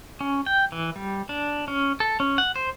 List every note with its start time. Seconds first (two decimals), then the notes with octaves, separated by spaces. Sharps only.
0.21 C#4
0.46 G5
0.72 E3
0.96 G3
1.29 D4
1.68 C#4
2.00 A4
2.20 C#4
2.38 F#5
2.56 C5